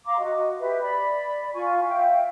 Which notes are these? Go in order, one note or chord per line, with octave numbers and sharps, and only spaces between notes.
F5 A#5 C6 D6
F#4 D#5
G4 B4 E5
D5 B5
F4 G#5 C#6
E5 F5 G5